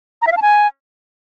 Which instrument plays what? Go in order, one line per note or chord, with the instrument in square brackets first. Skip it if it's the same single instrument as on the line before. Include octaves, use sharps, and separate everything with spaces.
[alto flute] A#5
E5
F5
A5
G#5